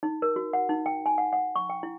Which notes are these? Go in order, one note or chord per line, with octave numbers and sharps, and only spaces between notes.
D#4
A#4
F#4
F#5
D#4
G5
G#5
F#5
F#5
C#6
G5
E4